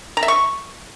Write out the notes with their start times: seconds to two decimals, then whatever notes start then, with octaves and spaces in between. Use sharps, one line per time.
0.17 A#5
0.23 E5
0.28 C#6